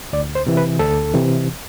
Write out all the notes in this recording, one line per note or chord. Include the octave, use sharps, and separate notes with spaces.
D2 D5
C5
C3 E3
B4
D2 A4
C3 E3